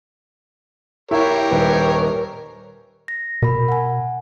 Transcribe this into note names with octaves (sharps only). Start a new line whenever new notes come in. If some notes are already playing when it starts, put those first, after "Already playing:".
E4 G4 A#4 C#5 E5
D#1 B4
A#6
B2 A#4 B5
F#5 G#5